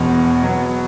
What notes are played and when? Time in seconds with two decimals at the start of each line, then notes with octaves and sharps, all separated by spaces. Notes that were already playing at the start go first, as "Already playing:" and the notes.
Already playing: E1 E2 B2
0.43 B2 F#3 B3